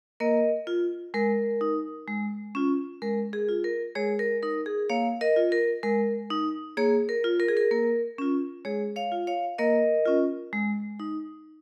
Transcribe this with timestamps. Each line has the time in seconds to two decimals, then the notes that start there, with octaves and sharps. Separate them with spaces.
0.20 A#3 A#4 D#5
0.67 F4
1.14 G#3 A#4
1.61 D#4
2.08 G#3
2.55 C#4 F4
3.02 G#3 A#4
3.33 G#4
3.49 F4
3.64 A#4
3.95 G#3 G#4 C#5
4.19 A#4
4.43 D#4 A#4
4.66 G#4
4.89 A#3 C#5 F5
5.21 A#4 D#5
5.36 F4
5.52 A#4
5.83 G#3 A#4
6.30 D#4
6.77 A#3 G#4 C#5
7.09 A#4
7.24 F4
7.40 A#4
7.48 G#4
7.57 A#4
7.71 A#3 A#4
8.18 C#4 F4
8.65 G#3 G#4 C#5
8.96 C#5 F5
9.12 F4
9.27 C#5 F5
9.58 A#3 A#4 D#5
10.06 C#4 F4
10.53 G#3
10.99 D#4